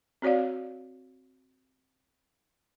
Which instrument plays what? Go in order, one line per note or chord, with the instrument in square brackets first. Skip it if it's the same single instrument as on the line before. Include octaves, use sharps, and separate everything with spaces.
[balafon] C4 F#4 C#5 D5 F5